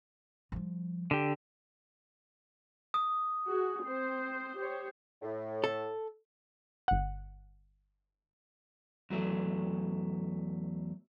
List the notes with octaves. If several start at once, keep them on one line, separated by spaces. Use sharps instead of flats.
F3 G3
D3 G4
D#6
F#4 G#4
C4 C5
G4 C5 C#5
A2
A4
G1 F#5
E2 F#3 A3